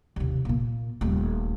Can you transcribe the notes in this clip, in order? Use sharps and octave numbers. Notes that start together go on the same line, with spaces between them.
D#2 C3
A#2 A#3
D#1 A3